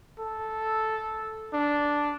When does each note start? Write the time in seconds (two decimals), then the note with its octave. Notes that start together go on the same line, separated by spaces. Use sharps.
0.19 A4
1.53 D4